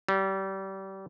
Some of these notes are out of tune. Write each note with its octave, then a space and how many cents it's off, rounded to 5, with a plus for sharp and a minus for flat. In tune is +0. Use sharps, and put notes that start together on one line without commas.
G3 -30